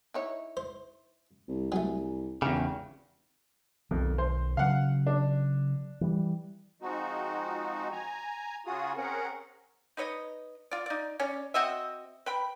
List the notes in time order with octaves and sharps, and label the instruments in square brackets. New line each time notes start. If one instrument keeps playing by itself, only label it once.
[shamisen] D#4 E4 C#5
[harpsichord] C5
[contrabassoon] C2
[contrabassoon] C2 [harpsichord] F#3 A3 [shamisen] G#4
[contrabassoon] G#1 [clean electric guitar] E2 C#3 [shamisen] G4
[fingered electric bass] B1 D#3 [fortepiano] F2
[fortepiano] C5
[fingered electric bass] C#3 F#3 [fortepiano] F5 F#5
[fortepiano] D4
[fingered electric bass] E3 G3
[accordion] F3 G#3 C4 D#4 F#4
G#5 A#5
C#3 F4 F#4 G#4 D#6
C4 C#4 G#4 A#4 F#5
[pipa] D#4 B4 C#5 D#5
F4 D5
D#4 D5
C#4 C#5 D5
C4 F#4 D#5 E5
B4 G5 B5